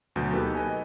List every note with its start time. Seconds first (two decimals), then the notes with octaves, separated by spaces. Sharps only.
0.16 D2 B2 F#3 G6
0.33 A#3 B3 D#4 G4 A4 B4
0.55 B4 D#5 G#5